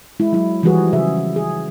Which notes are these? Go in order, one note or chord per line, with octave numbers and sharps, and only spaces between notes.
G#3 E4
F#3 E4
E3 F3 G3 F#4 G#4 B4
C#3 G#4 E5
G#4